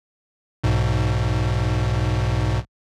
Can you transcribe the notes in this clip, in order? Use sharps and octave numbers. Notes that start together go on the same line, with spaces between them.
B1 G#2 B2